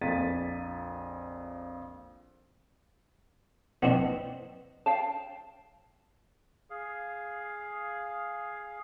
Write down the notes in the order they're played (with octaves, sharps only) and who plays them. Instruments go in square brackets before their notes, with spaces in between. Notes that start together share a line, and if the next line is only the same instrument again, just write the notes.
[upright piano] A#1 F2 A#3 A6 B6 D#7
[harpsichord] B3 C4 D4 [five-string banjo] D#5 F#5
[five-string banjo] F5 G5 A5
[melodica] G#4 F5